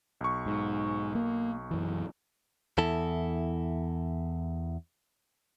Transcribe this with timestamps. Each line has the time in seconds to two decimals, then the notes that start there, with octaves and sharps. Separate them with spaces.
0.21 B1 C#6
0.46 G#2
1.15 A#3
1.71 F#2 E3
2.78 E2 E4 A4